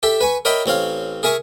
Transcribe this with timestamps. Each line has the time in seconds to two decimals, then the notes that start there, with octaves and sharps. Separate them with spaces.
0.03 G4 A4 E5
0.21 B4 G#5 C#6
0.45 A#4 C#5 D#5 E5 G5 B5
0.66 A1 C4 C#5 F5
1.23 G#4 A#4 E5 G#5 C#6